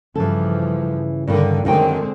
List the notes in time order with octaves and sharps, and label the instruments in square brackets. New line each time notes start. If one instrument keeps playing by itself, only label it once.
[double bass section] G2 F3 [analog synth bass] C#3 [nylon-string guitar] E3 A4
[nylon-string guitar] G2 D#3 [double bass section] D3
[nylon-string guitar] F#2 D#3 G5 [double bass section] D3 G#3 C4